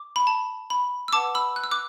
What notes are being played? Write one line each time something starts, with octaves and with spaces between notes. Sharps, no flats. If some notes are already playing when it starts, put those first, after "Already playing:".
Already playing: D6
B5
A5
B5
E6
B4 F#5 A5 D6
B5 E6
F#6
E6
D6 F#6